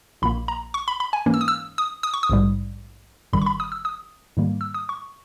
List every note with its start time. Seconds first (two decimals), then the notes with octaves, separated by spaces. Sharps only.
0.22 A#1 A#2 A#3 B5
0.48 A#5
0.74 C#6
0.88 B5
1.00 B5
1.13 G#5
1.26 G#2 E3 A#3 C#4
1.34 E6
1.41 D#6
1.48 E6
1.78 D#6
2.03 D#6
2.14 C#6
2.23 D#6
2.30 A#1 G#2 G3
3.33 G1 G2 D#3 G3 B5
3.42 C#6
3.46 B5
3.60 D#6
3.72 E6
3.85 D#6
4.37 G#2 D#3 G3 A#3
4.61 E6
4.74 D#6
4.89 C#6